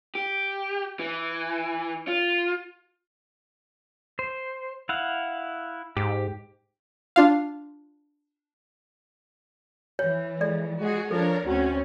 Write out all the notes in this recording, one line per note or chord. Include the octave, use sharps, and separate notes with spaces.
G4
E3
F4
C5
E4 F5 F#5
G#2 G4
D4 F4 F5
E3 C#5
G#3 A4 D5
G#3 F#4 G#4
F3 D4 A4 A#4 C#5
D2 C4 C#4 F#4